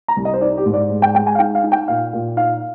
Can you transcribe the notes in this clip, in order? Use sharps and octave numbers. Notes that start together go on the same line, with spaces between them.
A#5
C2
D#5
C5
D#4 D5
G4
G#2
D5
G#3
G5
G#3 G5
G#5
F5
D#4 G5
F5
D#4
G5
A#2 F5
A#2
D#4 F5